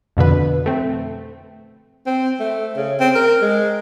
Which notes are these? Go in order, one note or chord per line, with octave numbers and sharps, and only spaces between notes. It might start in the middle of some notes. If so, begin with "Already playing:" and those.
F2 B2 D3 B4
A3 C4
C4
A3
C#3
C4
A#4
G#3